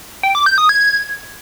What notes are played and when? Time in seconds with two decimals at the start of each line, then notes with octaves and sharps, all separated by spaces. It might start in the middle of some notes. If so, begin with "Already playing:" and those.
0.23 G5
0.35 D6
0.46 G6
0.58 D#6
0.69 G#6